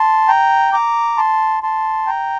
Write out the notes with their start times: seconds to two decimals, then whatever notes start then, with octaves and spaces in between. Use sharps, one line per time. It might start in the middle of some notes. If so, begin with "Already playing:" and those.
Already playing: A5 C6
0.28 G5 A#5
0.73 A#5 D6
1.17 A5 C6
1.63 A5 C6
2.07 G5 A#5